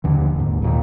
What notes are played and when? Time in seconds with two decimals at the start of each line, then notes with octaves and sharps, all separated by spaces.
0.04 D#2 D3 E3
0.36 D#2 G#2
0.62 D#2 A#2 D#3